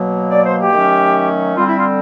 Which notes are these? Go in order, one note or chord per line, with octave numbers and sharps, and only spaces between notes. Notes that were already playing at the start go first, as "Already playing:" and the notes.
Already playing: B2 F#3 A#3
D5
C5
G4
D#3 F#3 A3 C#4
D3 G3 C4 F4
E4
F4